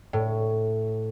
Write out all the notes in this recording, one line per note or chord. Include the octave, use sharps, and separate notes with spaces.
A2